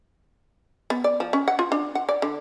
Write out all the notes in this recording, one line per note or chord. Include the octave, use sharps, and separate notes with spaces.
B3
D5
F3
C#4
F#5
F4
D4
F#5
D5
D3